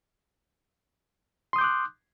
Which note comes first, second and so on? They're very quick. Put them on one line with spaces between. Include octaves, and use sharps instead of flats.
C6 D#6 G6 D6 F#6